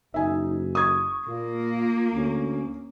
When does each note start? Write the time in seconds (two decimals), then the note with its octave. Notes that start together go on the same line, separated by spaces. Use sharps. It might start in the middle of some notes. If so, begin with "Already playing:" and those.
0.14 F#1 D#4 E5 G#5
0.75 C#6 D#6 G#6
1.27 A#2 A#3 F4
2.14 D2 C#4